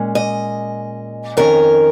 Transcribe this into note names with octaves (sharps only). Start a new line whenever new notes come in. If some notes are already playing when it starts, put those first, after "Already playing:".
Already playing: A#2 G#3 C#4
D#5
F2 D#3 C#4 A#4